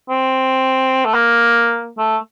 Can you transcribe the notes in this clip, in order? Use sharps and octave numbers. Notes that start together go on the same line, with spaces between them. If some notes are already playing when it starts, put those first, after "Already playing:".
C4
A3
A#3
A3